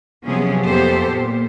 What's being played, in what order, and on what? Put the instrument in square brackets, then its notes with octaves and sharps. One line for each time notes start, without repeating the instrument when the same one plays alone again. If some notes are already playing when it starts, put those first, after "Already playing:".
[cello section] C3 F3 F#3 B3 C#4 G#4
F2 A#3 B3 G4 A4 C5
A#2